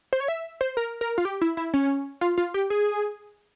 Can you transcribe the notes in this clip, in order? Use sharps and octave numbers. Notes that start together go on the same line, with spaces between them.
C5
C#5
E5
C5
A#4
A#4
F4
G4
E4
E4
C#4
F4
F4
G4
G#4